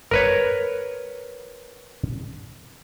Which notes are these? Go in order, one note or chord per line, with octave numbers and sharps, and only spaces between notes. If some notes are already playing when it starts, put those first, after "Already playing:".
A#4 B4 C#5